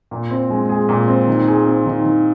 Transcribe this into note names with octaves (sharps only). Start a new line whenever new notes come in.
A#2
C4
G#3
G#4
A#2
C4
D#3
G#4
C4
D#3
D#3